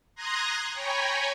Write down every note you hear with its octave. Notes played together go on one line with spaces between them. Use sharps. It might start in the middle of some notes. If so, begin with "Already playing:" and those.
A#5 C6 D#6 F#6 G#6 A#6
C#5 G5 G#5 A#5 B5 C#6